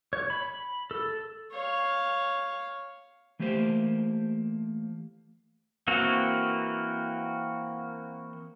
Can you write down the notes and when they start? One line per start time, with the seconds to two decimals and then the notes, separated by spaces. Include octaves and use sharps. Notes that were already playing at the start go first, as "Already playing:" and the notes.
0.13 C#5
0.30 B5
0.91 A4
1.52 C#5 F5
3.39 E3 A3 A#3 G4 C5
5.87 E3 A#3 C4 F#4